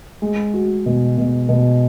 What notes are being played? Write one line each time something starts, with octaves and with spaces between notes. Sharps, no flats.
G#3
F#4
B2
B2
B2